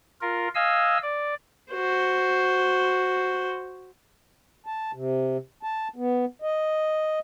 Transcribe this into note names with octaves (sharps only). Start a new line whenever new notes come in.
F4 A#4
D#5 F5 G#5 E6
D5
F#4 C5
A5
C3
A5
B3
D#5